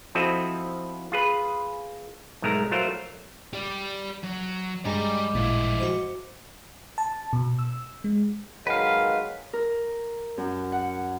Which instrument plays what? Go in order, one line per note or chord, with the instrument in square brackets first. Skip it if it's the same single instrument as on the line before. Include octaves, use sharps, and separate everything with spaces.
[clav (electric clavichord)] F3 C4 E4 F#4 A4 D#5
F4 G#4 B4
B1 G#2 G#3 A3 A#4 A#5
F#3 A3 F4 A#4 C5
[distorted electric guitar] G4 D5
F#3
[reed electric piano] G2 G#3 [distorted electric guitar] G3 D5 [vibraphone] D#5 D6 [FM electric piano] G#5 A#5
[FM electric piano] A1 A#2 [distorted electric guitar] F3 E4
[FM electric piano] F#4 C5
A5
B2
E6
G#3
[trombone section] D#3 F#3 G#3 [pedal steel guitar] B4 F5
[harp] A#4
F#2
F#5